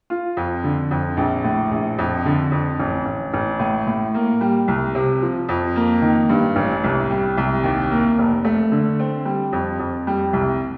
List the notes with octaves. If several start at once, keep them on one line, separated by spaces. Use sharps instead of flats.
F4
F2
D3
F2
A#1
A2
A#1
F2
D3
F2
A1
A1
A1
A2
A2
A#3
G3
C2
C3
F3
F2
A#3
D#3
G2
A1
C2
G3
C2
D#2
A#3
F1
A3
D3
C4
G3
F2
F2
G3
C2